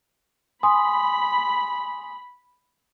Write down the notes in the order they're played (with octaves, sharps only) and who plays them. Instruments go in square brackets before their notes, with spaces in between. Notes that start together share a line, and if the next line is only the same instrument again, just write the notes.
[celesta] G#5 C6 D#6 [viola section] B5